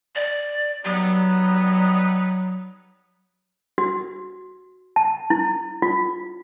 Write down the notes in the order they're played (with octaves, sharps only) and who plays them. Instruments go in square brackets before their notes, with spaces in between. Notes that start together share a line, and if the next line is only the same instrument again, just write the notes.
[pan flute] D5
[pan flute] F#3 [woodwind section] G3 B3 D#4
[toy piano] F#4
A5
E4
F4